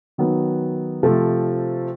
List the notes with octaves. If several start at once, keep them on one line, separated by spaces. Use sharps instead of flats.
D#3 F#3 B3
C3 F3 A3